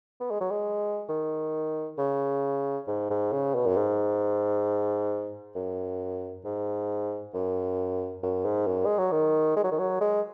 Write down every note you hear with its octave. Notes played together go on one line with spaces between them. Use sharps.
B3
G#3
F#3
G#3
D#3
C#3
G#2
G#2
C#3
B2
F#2
G#2
F#2
G#2
F#2
F#2
G#2
F#2
G#3
F#3
D#3
G#3
F#3
D#3
F#3
G#3